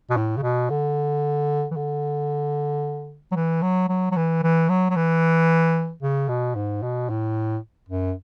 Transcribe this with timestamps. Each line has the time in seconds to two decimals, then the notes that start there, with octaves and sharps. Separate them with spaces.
0.10 B2
0.17 A2
0.37 C#3
0.43 B2
0.70 D3
1.71 E3
1.77 D3
3.32 F#3
3.36 E3
3.62 F#3
3.89 F#3
4.11 F#3
4.17 E3
4.43 E3
4.69 F#3
4.90 F#3
4.96 E3
6.03 C#3
6.29 B2
6.55 G#2
6.83 B2
7.10 A2
7.89 F#2